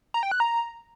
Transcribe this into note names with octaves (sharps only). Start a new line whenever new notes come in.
A#5
G5
F#6
A#5